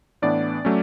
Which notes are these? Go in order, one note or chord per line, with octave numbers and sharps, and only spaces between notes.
A2 E3 B3 D4 D5
F#3 A3 C#4